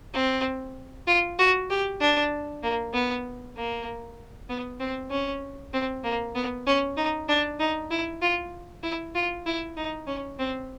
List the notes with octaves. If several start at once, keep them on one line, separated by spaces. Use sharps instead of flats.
C4
F4
F#4
G4
D4
A#3
B3
A#3
B3
C4
C#4
C4
A#3
B3
C#4
D#4
D4
D#4
E4
F4
E4
F4
E4
D#4
C#4
C4